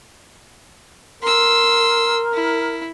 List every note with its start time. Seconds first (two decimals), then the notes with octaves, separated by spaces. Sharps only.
1.23 A#4 C6 E6
2.33 E4